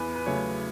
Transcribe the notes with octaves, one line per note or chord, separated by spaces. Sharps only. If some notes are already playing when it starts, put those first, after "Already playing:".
Already playing: E2 B4
B4
C#3 F#3 A3 C#5